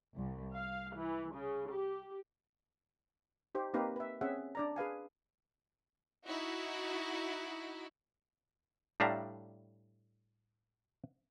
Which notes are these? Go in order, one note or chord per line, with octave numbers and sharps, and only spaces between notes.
C2
F5
E3
C#3
G4
D#4 G4 C5
A#3 C4 D#4 G4 B4 F5
B4 E5
C4 C#4 G#4 E5 F#5
D4 D5 A#5
G#4 B4 F5 G#5
D#4 E4 F#4
A2 G3 D4 E5 F5 A#5